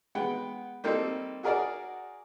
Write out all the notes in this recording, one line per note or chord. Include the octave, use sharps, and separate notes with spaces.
G#3 B3 F#5 G5
G3 A#3 C4 D#4 A4
F#4 G#4 A#4 D5 F#5